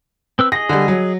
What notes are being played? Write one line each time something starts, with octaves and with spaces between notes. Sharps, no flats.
C4 B4 E6
G#4 D#5 A#6
D3 G3
F#3